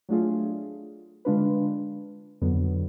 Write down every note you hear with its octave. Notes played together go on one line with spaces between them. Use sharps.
F#3 A3 D4 F4 G#4
D3 G#3 D4 F4 B4
F2 D3 F#3 B3